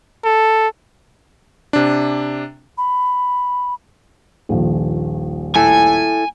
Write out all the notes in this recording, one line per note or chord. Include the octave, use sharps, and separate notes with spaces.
A4
C3 D4
B5
D#1 A#1
E4 A4 G#5